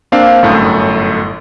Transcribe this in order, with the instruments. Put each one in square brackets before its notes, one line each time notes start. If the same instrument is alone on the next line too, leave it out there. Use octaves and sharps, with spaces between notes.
[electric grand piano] A#3 C4 D4 F5
G1 F#2 A2 A3